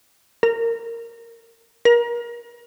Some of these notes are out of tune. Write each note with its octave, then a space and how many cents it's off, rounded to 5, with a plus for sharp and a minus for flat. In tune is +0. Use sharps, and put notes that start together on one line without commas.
A#4 -20
A#4 +30